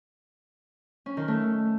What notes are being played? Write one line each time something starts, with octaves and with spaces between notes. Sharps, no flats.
C#4
D#3
A3